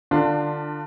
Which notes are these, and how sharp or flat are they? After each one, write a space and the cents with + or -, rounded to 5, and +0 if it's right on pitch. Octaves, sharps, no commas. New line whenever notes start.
D3 +25 D4 +10 F4 +0